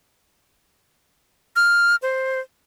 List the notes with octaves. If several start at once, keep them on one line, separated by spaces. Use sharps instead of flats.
F6
C5